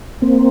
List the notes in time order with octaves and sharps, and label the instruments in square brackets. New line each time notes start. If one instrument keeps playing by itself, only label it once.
[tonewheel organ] A#3 C4